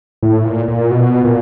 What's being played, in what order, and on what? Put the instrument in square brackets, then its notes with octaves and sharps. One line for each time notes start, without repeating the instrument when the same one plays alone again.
[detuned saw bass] A2
A#2
A#2
B2
A#2